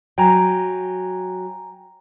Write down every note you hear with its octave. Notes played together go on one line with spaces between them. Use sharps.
F#3 G5 G#5 A#5